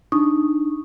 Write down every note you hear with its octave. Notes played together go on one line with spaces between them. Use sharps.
D4 D#4 C#6 D#6